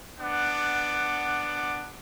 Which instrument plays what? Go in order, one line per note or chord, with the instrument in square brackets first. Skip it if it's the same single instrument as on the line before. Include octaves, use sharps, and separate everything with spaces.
[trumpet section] B3 D4 F#5 D6